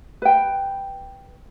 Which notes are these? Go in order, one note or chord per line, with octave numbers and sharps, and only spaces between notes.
B4 G5